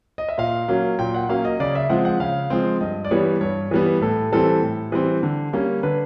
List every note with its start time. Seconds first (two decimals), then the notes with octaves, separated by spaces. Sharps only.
0.18 D#5
0.29 E5
0.38 A#2 F5
0.68 F#3 A#3 C#4
0.99 A#2 G5
1.14 F#5
1.29 F#3 A#3 C#4 F5
1.45 D#5
1.60 C#3 D5
1.75 E5
1.89 F3 G#3 C4 F#5
2.05 F#5
2.20 C#3 F5
2.50 F3 G#3 C4
2.80 G2 D#5
3.05 D5
3.11 E3 G3 B3 C#5
3.41 G2 C#5
3.71 E3 G3 B3
4.01 A2 A4
4.32 E3 G3 C4 A4
4.62 A2
4.92 E3 G3 C4
5.23 D3
5.53 G3 A#3 C#4
5.83 D3 B4